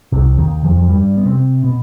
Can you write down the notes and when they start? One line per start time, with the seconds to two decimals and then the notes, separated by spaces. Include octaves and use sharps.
0.12 C2 C3
0.38 D#2 D#3
0.64 F2 F3
0.77 F3
0.89 G2 G3
1.17 B3
1.26 C3 C4
1.64 B2 B3